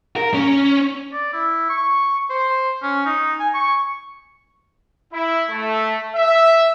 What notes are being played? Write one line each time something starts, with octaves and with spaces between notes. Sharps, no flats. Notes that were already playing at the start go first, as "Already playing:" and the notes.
A#4
C#4
D5
E4
C#6
C5
C#4
D#4
G#5
C#6
E4
A3
E5